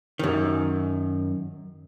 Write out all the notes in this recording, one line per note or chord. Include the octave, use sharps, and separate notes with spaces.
F#2 D#3